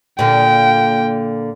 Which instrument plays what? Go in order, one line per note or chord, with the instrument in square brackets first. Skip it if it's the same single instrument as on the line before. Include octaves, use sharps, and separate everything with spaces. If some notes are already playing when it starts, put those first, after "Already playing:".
[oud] A#2 D3 [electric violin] G5